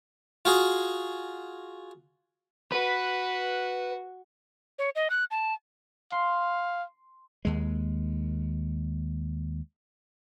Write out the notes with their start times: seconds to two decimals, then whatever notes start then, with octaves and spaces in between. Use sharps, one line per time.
0.45 F4 F#4 G#4
2.72 F#4 B4
4.79 C#5
4.95 D#5
5.10 F#6
5.31 A5
6.12 F5 C6
7.45 D#2 G#3